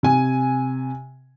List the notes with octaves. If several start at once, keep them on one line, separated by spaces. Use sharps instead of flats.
C3 G#5